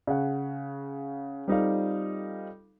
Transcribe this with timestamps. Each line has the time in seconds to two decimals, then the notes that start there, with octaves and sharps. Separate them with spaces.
0.07 C#3 F#5
1.48 G3 C4 D#4 F4 A4 F5